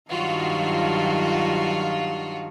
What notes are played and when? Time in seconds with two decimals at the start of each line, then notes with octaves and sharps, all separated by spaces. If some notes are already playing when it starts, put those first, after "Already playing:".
0.11 G2 D#3 F#3 F4 F#4